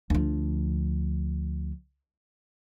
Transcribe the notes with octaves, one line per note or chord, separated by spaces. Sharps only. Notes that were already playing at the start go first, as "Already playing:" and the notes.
D2 F3